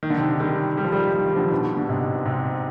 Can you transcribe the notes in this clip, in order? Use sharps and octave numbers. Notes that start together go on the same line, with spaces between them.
D#3
D3
C3 D#3
D#3 G3
G3
F3
D#3 G3
F3
D#3
D3 F3
B2 D3
D3
G#2 C3
G#2 C3